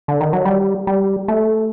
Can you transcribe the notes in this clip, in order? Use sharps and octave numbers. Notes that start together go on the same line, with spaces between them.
D3
D#3
F#3
G3
G3
A3